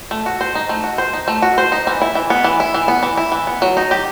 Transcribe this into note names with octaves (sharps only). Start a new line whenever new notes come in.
A3
F#4
C5
D#4
A3
F#4
C5
D#4
A3
F#4
C5
D#4
E3
E4
E3
B3
E3
E4
E3
B3
E3
E4
E3
B3
F#3
D#4
G4